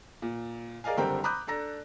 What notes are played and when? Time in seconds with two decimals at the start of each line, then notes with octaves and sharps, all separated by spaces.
0.22 A#2
0.84 G#4 A#4 D5 D#5 F5 G#5
0.97 F#1 D3 G3 C4 A#4 G5
1.24 A#5 B5 D6 D#6 F#6 G6
1.47 D4 A4 A#5 A#6